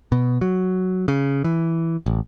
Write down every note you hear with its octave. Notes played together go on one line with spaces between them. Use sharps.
B2
F#3
C#3
E3
A1